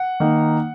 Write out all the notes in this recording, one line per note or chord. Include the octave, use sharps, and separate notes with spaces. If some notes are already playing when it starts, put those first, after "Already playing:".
Already playing: F#5
D#3 A#3 D#4